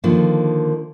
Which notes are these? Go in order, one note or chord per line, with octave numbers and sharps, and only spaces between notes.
D3 D#3 F3 A#3